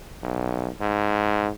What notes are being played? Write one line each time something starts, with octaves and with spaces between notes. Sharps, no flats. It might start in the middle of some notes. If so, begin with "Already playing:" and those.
B1
G#2